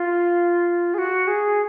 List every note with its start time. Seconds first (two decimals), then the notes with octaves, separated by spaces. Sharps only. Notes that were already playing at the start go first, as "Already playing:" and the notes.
Already playing: F4
0.94 G#4
0.98 F#4
1.27 G#4